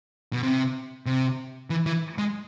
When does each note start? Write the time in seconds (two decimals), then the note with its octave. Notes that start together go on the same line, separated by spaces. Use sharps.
0.33 B2
0.43 C3
1.06 C3
1.70 E3
1.86 E3
2.18 G#3